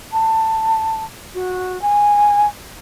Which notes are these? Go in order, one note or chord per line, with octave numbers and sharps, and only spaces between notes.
A5
F#4
G#5